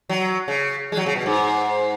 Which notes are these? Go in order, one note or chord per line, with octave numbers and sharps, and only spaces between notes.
F#3
C#3
G#3
F#3
C#3
B2
G#2